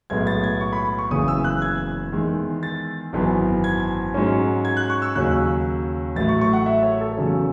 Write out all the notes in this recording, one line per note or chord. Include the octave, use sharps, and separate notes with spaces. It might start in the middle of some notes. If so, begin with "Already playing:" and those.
B1 A2 G#3 B3 G#6
A6
G#6
C#6
B5
C#6
F#1 E2 C#3 E3 D#6
E6
F#6
G#6
E2 D#3 G#3
A6
G#1 F#2 E3 B3
G#6
G#2 F#3 C#4
G#6
F#6
C#6
E6
D#2 C#3 F#3 C#4 F#6
A1 A2 F#3 A3 A6
C#6
C#6
F#5
E5
C#5
A4
E2 C#3 F#3 C#4